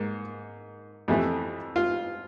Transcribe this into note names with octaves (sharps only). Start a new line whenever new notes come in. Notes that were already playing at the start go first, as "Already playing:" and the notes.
Already playing: G#2 A#3
F2 C3 E3 A3
F4